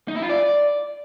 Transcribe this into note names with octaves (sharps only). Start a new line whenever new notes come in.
D#4
E4
F4
D5